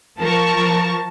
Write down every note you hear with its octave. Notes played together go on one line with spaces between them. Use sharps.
F3 A#4 A5 C#6